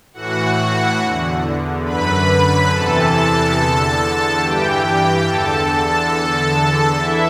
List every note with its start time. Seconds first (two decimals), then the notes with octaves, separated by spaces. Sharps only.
0.14 A2 E3 F#4 F#5
1.00 E2 D3
1.85 F#2 D3 B4 B5
2.70 E2 C3 E3 A4 A5
3.13 A4 A5
3.56 E2 D3
4.42 G2 E3 G4 G5
5.27 E2 D3 A4 A5
6.12 E2 D3 A4 A5
6.98 E3 E4 E5